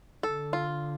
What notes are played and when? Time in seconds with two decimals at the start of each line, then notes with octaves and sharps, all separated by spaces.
0.23 D3 A4
0.53 F4